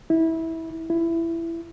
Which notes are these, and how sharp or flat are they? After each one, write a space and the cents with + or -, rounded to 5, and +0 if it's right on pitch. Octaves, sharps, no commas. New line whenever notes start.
E4 -20
E4 +15